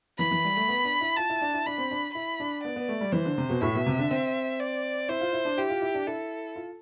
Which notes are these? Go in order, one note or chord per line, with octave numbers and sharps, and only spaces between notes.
E3 B5
E3
G3
A3
B3
D4
E4
F4 A5
E4
D4
E4
D4 B5
C4
D4
E4 B5
D4
B3 D5
B3
A3
G3
E3 C5
D3
C3
B2
A2 E5
B2
C3
D3
C4
D5
E4 C5
F4
E4
D4
E4 G4
F4
E4
D4
E4 A4
F4